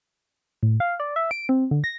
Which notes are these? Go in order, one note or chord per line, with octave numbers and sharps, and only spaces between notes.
A2
F5
D5
E5
D7
C4
D3
A#6